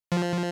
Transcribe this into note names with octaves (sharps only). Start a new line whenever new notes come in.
F3